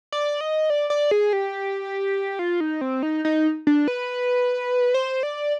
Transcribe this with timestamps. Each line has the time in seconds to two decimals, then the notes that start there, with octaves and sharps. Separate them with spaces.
0.12 D5
0.41 D#5
0.70 D5
0.90 D5
1.11 G#4
1.33 G4
2.39 F4
2.60 D#4
2.81 C4
3.03 D#4
3.25 D#4
3.67 D4
3.88 B4
4.94 C5
5.23 D5